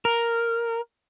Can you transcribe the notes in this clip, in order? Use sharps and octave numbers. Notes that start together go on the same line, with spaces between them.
A#4